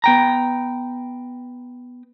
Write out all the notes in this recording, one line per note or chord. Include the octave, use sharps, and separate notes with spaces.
B3 G5 A#5